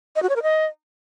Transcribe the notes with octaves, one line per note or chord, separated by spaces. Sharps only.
D#5
F#4
C#5
A#4
D#5